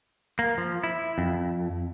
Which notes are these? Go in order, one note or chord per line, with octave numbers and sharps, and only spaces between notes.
A#3
F3
E4
F2